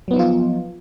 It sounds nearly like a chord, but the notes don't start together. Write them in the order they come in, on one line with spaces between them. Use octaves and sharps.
F#3 B3 D#4 F3 F4